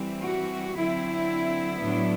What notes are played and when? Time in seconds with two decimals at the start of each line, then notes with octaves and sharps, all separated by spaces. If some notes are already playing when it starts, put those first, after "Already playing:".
Already playing: E3 G3 C4
0.23 F#4
0.75 D3 F#3 C4 E4
1.81 A2 F#3 B3 D4